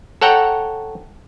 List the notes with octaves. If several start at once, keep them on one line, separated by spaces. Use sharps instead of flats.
A4 C#5 F#5 G5 A#5